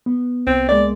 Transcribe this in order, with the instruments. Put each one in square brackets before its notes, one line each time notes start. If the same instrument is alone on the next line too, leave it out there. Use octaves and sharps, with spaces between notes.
[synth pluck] B3
[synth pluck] C2 [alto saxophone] C4
[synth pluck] G#3 A#3 [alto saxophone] D5